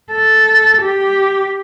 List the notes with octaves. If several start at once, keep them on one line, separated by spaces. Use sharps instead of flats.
A4
G4